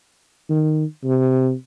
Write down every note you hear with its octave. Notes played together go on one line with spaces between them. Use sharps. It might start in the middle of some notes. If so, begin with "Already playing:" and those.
D#3
C3